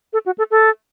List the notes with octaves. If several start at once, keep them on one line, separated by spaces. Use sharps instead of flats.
A4
F#4
A4
A4